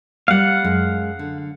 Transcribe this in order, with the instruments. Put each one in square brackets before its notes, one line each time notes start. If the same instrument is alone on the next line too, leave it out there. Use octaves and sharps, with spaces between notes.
[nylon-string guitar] G3 A#3 [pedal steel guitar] F5 F#5
[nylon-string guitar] F#2 G#3
D3